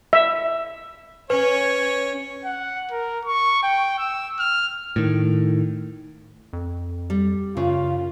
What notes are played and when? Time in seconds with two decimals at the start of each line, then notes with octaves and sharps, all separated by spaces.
0.13 E5
1.30 C#4 B4 C#5
2.44 F#5
2.91 A#4
3.25 C#6
3.63 G5
3.98 E6
4.39 F6
4.96 A2 D#3
6.53 F2
7.10 G3
7.57 F#2 C#3 F4